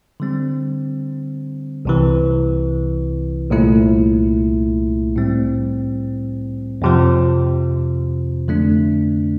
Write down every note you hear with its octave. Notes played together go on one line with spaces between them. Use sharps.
D3 G3 C4
C2 C3 E3
C2 A#2 A3 E4
A2 G3 C4
F2 C3 F3
F2 D3 A3 D4